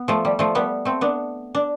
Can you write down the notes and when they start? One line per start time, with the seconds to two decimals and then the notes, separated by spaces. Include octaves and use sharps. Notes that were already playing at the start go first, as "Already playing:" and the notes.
Already playing: B3
0.08 F3 A3
0.25 G3
0.39 F3 A3
0.55 G3 B3
0.85 A3 C4
1.01 B3 D4
1.55 D4